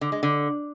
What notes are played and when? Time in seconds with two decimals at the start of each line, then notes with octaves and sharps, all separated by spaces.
0.01 D3
0.12 G#3
0.23 D3